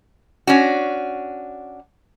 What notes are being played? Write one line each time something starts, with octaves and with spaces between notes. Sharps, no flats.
C#4 D4 F#4